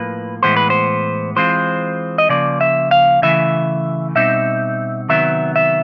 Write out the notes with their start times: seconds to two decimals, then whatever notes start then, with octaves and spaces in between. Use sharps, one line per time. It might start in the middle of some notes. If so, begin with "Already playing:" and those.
Already playing: A2 F3 A#3 B4
0.43 A2 E3 G#3 B3 C5
0.57 B4
0.70 C5
1.36 E3 G#3 C4 F4 C5
2.18 D#5
2.29 C#3 F3 A#3 D5
2.61 E5
2.91 F5
3.22 C#3 E3 A3 E5
4.15 B2 G3 C4 D#4 E5
5.09 C3 D#3 F#3 B3 E5
5.56 E5